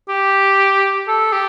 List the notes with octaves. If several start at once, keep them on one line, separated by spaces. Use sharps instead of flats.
G4
A4
G4